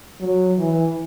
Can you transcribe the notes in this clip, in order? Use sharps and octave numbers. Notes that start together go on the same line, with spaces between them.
F#3
E3